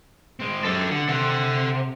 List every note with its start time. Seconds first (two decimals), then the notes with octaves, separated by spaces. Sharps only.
0.40 G#3 C4
0.64 F#2 G4 A4
0.91 D3 F#5
1.09 C3 A4 F#5